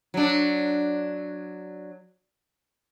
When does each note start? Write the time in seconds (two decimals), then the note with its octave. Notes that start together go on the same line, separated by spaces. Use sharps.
0.14 F#3 D4